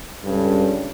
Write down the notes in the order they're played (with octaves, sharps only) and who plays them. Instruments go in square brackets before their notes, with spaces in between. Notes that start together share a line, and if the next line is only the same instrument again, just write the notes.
[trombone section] C#2 G2 C#4 A4